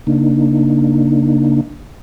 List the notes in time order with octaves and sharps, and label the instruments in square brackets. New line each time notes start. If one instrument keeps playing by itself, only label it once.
[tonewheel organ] C#3 A#3 D4 D#4